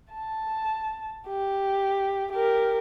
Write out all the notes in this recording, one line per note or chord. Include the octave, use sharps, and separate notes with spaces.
A5
G4
G4 A#4